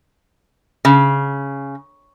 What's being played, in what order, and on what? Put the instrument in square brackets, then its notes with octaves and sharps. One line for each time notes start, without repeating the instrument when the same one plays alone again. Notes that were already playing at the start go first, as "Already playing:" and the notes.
[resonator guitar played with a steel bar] C#3